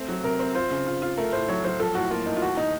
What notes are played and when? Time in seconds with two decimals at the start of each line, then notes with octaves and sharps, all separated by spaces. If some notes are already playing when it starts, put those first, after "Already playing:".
Already playing: A3 C4
0.08 F#3
0.24 C3 A#4
0.39 C4
0.55 F4 C5
0.71 C#3
0.87 F4
1.02 F4
1.18 A3 A#4
1.33 A2 C5
1.48 F#3 C#5
1.64 F#3 C5
1.80 F3 A4
1.95 A2 F#4
2.11 A#3 F4
2.26 A2 D#4
2.37 F4
2.42 D#2 F#4
2.57 D#4